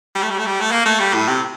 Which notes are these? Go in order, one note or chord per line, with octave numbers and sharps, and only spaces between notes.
G3
A3
G3
A3
G3
A3
A#3
A3
G3
A2
C3